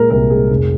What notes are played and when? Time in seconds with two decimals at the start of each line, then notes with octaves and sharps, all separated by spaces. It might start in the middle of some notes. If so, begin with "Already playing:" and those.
Already playing: A#2 G#3 A#4
0.10 C2 A#4
0.30 A#2 G#3 G#4
0.50 F1